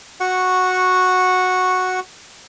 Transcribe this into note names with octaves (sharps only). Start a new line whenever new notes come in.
F#4 F#5 C#6